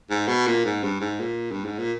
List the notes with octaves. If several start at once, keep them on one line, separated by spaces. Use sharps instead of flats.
G#2
B2
A#2
G#2
G2
G#2
A#2
G2
G#2
A#2